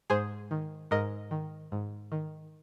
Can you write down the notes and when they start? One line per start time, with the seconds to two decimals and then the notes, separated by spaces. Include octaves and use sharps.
0.10 G#2 G#4 C5
0.51 D#3
0.91 G#2 A#4 D#5
1.31 D#3
1.72 G#2
2.12 D#3